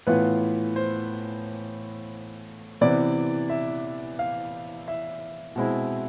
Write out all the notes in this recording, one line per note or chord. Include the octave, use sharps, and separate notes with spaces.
A2 E3 B3 F4 B4
C5
C3 E3 B3 D5
E5
F5
E5
B2 G#3 C4 E4